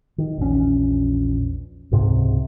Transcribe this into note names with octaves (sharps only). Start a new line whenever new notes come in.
D#3
A#1 E2 D3 C#4
C#2 G#2 C3